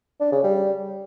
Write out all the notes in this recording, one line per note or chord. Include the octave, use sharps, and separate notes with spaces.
D4
C#3
G3